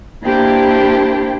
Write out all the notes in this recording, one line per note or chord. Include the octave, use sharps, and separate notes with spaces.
A#3 D4 E4 G4 C5 G5